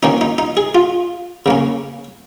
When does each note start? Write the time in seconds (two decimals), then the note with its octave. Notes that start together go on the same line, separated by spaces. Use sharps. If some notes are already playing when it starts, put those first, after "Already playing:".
0.03 D#3 A#3 C#4 D#4
0.21 D#4
0.38 D#4
0.57 G#4
0.75 F4
1.46 C#3 A#3 C#4